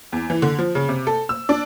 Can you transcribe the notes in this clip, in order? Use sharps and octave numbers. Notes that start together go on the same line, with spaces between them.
E2
E3
D3
F3
C#3
C3
A4
E6
D4